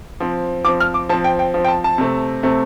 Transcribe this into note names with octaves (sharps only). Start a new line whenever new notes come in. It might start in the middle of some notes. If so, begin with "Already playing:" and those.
F3 C4
F3 C4 D6
F6
D6
F3 C4 A5
G5
G5
F3 C4
G5
A5
A5
C3 A3 C4
C3 A3 C4